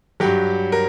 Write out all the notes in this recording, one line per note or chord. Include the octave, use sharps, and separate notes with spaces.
G2 F#3 G4
A#4